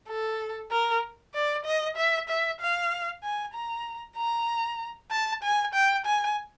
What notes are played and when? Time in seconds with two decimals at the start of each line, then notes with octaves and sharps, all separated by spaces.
0.09 A4
0.71 A#4
1.34 D5
1.65 D#5
1.96 E5
2.29 E5
2.61 F5
3.23 G#5
3.54 A#5
4.17 A#5
5.11 A5
5.43 G#5
5.74 G5
6.06 G#5